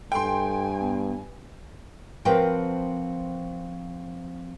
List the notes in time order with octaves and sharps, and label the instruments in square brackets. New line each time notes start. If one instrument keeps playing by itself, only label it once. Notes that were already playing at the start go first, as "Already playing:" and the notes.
[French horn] G2 [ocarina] A4 [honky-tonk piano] G5 C6 [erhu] G#5
[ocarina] B3
[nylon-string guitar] F3 C4 F#4 A#4 B4 G5